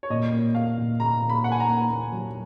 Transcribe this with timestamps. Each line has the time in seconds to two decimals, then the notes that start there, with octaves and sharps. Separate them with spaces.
0.03 C#5
0.10 A#2 D#5
0.33 A#3
0.55 A#3 F5
0.78 A#2
1.00 A#2 A#5
1.22 A#2
1.30 B5
1.44 A#3 F#5
1.52 G#5
1.60 A#5
1.68 A#3
1.90 A#3
2.12 F#3